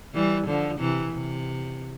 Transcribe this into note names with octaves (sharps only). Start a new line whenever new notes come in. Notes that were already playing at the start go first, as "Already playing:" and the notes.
E3 G3
D3 F3
C3 E3
C3